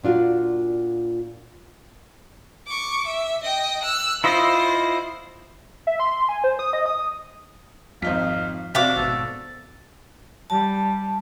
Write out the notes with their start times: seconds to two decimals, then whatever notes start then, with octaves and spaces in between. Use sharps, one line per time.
0.04 A#2 D4 F4 F#4
2.67 C#6 D6
3.07 E5
3.44 D#5 G5
3.82 E6 F#6
4.24 E4 F4 C5 D#5
5.87 E5
6.00 C6
6.29 G#5
6.44 C5
6.59 D#6
6.73 D#5
6.86 D#6
8.02 G#1 F2 D#4 F5 B6
8.75 C3 C4 D4 F#4 D5 E5 F5 D6
8.96 G#1 B2 A4
10.50 G3 A5